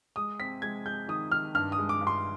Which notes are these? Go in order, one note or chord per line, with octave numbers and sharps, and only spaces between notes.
G#3 D#6
C4 B6
G#3 G#6
G#3 G6
D#3 D#6
D#3 F6
G2 F6
D#6
G#3
D6
G2
C6